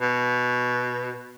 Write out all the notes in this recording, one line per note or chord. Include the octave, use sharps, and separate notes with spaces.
B2